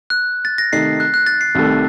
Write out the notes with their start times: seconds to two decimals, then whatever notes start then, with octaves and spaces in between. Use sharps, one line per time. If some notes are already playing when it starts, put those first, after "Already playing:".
0.10 F#6
0.45 A6
0.58 A#6
0.73 C3 D#3 A3 D#4 C7
1.00 F#6
1.14 F#6
1.26 A6
1.41 C7
1.55 C2 C3 D#3 A3